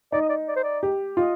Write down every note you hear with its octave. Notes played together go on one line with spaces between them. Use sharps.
D#4 D5
D#5
D5
D5
C5
D5
G4
F4 D#5